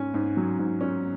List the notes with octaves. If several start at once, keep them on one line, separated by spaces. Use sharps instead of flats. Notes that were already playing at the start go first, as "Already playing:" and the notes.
Already playing: G#2 C#4 G#5
G#2
F#3
G#2
C#4